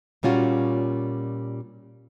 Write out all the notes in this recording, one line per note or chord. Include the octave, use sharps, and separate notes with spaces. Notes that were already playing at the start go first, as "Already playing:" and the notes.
A#2 G3 C#4 F4 F#4